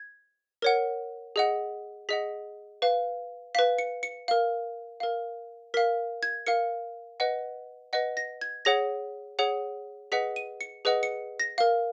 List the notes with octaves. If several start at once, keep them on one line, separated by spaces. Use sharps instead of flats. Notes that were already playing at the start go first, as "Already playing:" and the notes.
Already playing: G#6
A#4 C#5 F#5
G#4 D#5 F#5
G#4 D#5 F#5 B6
B4 F5
B4 F5 B6
C#7
C#7
A#4 F5
A#4 F5
A#4 F5 B6
G#6
A#4 F5 C#7
B4 D#5 F#5
B4 D#5 F#5
A#6
G#6
G#4 C#5 F#5 A#6
G#4 C#5 F#5
G#4 B4 D#5 F#5 B6
D#7
C#7
G#4 B4 D#5 F#5
C#7
A#6
A#4 F5